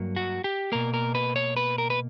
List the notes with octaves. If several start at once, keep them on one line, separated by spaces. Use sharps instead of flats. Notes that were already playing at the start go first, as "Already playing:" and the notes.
Already playing: G2 F#3 A#3
F#4
G4
B2 A#3 A#4
A#4
B4
C#5
B4
A#4
B4